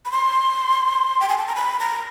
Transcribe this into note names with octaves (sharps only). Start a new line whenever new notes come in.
B5
C6
G5
G#5
A5
A#5
B5
A#5